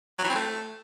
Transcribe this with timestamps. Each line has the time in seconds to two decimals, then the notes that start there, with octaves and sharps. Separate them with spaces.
0.18 F#3
0.24 E3
0.29 C4
0.35 A3